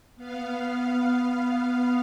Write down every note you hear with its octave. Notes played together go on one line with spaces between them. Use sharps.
B3 F5